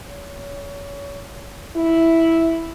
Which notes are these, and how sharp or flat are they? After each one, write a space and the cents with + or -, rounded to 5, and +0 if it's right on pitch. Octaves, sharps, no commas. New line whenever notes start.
C#5 +30
E4 +0